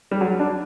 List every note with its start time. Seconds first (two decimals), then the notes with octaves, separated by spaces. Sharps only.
0.11 G3
0.21 F#3
0.39 D4